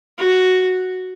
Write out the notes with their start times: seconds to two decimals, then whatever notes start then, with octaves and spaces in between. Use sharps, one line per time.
0.18 F#4